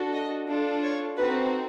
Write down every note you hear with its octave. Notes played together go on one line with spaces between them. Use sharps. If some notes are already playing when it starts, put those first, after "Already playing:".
Already playing: D4 F#4 A4
D#5
D4 F4 A4
C#5
C4 D#4 F#4 A4 B4